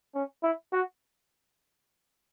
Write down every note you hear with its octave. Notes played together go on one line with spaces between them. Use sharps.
C#4
E4
F#4